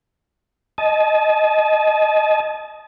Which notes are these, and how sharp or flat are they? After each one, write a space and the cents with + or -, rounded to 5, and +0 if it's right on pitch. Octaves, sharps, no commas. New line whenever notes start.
D#5 +0 A5 -35